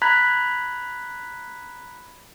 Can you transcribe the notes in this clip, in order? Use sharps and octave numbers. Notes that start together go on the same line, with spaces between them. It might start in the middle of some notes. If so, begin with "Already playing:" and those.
A#5 B5 F#6 G#6 B6